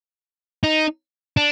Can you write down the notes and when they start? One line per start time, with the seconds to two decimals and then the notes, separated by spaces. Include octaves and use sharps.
0.64 D#4
1.37 D4